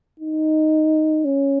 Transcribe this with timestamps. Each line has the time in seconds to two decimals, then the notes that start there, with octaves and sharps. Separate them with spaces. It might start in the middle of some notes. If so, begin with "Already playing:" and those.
0.19 D#4
1.25 C#4